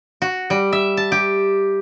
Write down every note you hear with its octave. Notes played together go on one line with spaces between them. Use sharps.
F#4
G3
E5
A5
G4